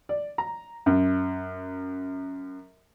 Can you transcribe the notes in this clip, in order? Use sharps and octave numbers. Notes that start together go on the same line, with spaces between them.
D5
A#5
F#2